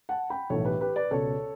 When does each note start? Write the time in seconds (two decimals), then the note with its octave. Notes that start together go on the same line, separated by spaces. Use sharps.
0.09 F#5 A5
0.30 G5 B5
0.50 B1 A2 E3 A4 C#5
0.65 G4 B4
0.81 G4 B4
0.96 B4 D5
1.11 C#2 B2 A4 C#5